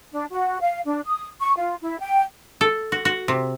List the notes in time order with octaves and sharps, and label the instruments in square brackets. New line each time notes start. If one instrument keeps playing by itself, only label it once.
[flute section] D4
F#4
F5
D4
D#6
C#6
F4
E4
G5
[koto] A4
F#4
F#4
C3